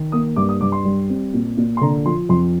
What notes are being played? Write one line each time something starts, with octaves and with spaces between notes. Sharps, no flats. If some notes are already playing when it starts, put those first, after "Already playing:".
Already playing: D#3
A#3 D#6
G2 D6
D#6
G2 D6
C6
G3
C4
A#2
A#2
C6
D3 A#5
F3 C6
F2 C6